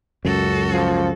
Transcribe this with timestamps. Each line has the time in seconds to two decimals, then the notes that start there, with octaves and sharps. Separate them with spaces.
0.25 C#2 F#2 F#4 A4
0.72 F3